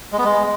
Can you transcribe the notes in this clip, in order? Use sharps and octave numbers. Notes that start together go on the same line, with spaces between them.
G#3
B3
G#3